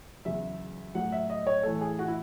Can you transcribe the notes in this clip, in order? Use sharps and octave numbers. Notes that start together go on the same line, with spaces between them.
E2 C#3 F#3 E5
A2 F#3 F#5
E5
D#5
C#5
A2 E3 A4
G#4
F#4
E4